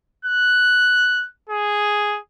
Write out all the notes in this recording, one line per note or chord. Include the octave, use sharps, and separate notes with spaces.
F#6
G#4